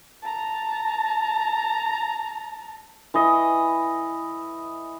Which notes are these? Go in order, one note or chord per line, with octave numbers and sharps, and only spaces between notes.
A5 A#5
E3 B4 D#5